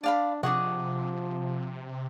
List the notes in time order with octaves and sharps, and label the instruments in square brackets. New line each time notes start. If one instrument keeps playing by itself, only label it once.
[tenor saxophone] D4 [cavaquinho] D5 F5 B5
[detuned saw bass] C3 [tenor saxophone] F3 [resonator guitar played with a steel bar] D4 G#4 D#5 [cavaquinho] F#5 C#6